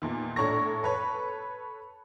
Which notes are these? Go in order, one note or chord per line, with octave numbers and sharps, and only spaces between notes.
E2 A#2 D#3
A2 D4 C#5 A#5 C#6 A#6
A4 B4 C#5